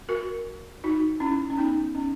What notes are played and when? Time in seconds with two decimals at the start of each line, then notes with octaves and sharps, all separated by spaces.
0.09 F#4 A#4
0.84 D#4 F#4
1.20 C#4 E4
1.50 C#4
1.57 B3 D#4
1.95 C#4